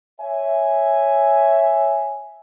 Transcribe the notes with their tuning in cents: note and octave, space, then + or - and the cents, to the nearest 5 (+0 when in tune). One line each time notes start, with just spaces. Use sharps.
C#5 +0 E5 +0 G#5 +0